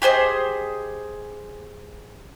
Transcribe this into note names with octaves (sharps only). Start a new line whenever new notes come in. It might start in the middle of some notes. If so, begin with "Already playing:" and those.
G4 G#4 C5 D#5